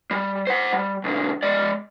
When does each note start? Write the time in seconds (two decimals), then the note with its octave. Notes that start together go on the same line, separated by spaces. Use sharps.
0.11 G3
0.47 C5 F#5
0.73 G3
1.04 B1 D3
1.43 G#3 D5